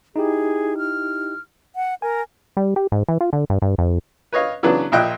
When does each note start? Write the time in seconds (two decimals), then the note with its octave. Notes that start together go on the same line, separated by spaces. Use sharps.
0.16 D#4 E4 G4 G#4
0.78 F6
1.76 F#5
2.02 A#4 G#5
2.57 G3
2.76 G4
2.92 G#2
3.09 E3
3.21 F4
3.33 D3
3.50 G2
3.62 G2
3.78 F2
4.33 B4 C#5 D#5 F5
4.63 C#3 E3 F#3 B3 D4
4.92 A#1 A#2 D#5 E5 G5 F#6